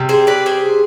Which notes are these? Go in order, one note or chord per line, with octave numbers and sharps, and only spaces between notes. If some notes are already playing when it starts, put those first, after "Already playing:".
Already playing: C3 G3
G#4 C5
B4 D5
G#4 C5